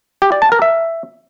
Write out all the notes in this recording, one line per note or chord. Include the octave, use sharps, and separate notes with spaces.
G4
D5
A5
A#4
E5